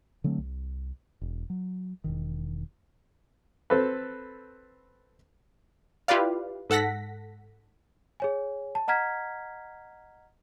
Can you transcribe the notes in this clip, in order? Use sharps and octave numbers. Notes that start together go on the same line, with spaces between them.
D3 F#3 A3 C4
C2
E1
F#3
E1 B1 D#3
C4 A4 B4
E4 F4 G4 B4 D5 F5
G#2 A4 F#5 A#6 B6
G#4 C#5 G#5
A5
D#5 F#5 A#5 F6 G#6 B6